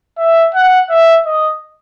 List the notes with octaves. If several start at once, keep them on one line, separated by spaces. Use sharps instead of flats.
E5
F#5
E5
D#5